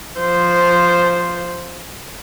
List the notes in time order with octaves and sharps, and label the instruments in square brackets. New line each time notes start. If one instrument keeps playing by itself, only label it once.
[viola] F3 C5